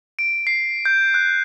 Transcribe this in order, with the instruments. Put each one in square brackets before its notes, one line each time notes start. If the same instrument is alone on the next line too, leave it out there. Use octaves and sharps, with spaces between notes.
[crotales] D7
C7
G6
F#6